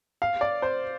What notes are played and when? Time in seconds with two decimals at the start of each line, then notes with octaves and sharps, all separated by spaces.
0.22 F5
0.41 D5
0.62 C5